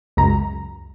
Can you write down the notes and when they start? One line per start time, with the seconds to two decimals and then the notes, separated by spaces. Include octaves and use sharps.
0.17 C#2 F#2 A#5